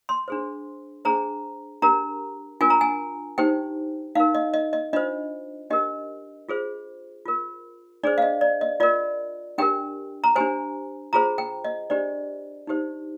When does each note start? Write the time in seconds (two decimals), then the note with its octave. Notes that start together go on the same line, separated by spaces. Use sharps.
0.09 C6
0.28 D4 G#4 C5
1.05 D4 G#4 C5 A#5
1.82 D4 G4 A#4 A#5
2.61 D4 F4 A#4 G#5
2.70 A#5
2.81 G#5
3.38 D#4 G4 C5 G5
4.15 D#4 A#4 F5
4.35 D#5
4.54 D#5
4.73 D#5
4.93 D4 F4 C5 D#5
5.70 D4 G4 A#4 D#5
6.49 F4 G#4 C5
7.26 F4 A#4
8.04 D4 G#4 C5 D5
8.18 F5
8.22 D#5
8.41 D5
8.61 D#5
8.80 F4 A#4 D5
9.58 D4 G4 A#4 G5
10.24 A#5
10.36 D4 G4 C5 G#5
11.13 F4 G#4 C5 A#5
11.38 G5
11.64 D#5
11.90 D4 G4 C5 D5
12.67 D#4 G4 C5